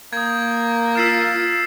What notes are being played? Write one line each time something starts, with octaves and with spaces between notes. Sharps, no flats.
A#3 D#6 G6 G#6
F4 E6 F6 A6 B6 C7 E7